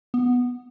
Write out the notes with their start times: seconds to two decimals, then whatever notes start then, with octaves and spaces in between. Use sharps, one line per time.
0.14 B3